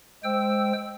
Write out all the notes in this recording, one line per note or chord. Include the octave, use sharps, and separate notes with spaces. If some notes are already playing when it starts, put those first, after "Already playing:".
G#3 C5 G5 E6